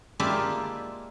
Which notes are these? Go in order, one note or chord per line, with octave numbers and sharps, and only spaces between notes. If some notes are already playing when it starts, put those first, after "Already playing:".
G#3 A#3 D4 E4 F4 G4